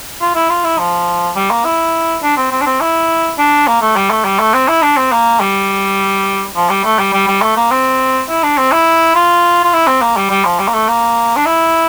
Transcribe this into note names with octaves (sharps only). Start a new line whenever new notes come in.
F4
E4
F4
E4
F3
G3
A#3
E4
D4
C4
C4
D4
C4
E4
D4
A#3
A3
G3
A3
G3
A3
C4
E4
D4
C4
A#3
G3
F3
G3
A3
G3
G3
G3
A3
A#3
C4
E4
D4
C4
E4
F4
F4
E4
C4
A#3
G3
G3
F3
G3
A#3
A3
A#3
D4
E4